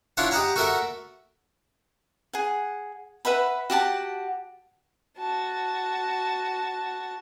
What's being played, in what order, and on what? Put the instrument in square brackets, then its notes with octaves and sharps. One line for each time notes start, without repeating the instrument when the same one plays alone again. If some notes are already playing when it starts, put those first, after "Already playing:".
[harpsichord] D4 E4 F4 C#5 F#5 A5
G4 D#5 F#5 A5 A#5
F#4 A4 A#4 E5 F#5
[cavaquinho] G#4 F#5
B4 E5 F#5 B5
F#4 G4 F#5 A5
[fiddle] F#4 A5